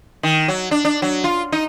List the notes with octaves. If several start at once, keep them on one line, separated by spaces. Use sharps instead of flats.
D#3
F#3
D4
D4
F#3
F4
D#4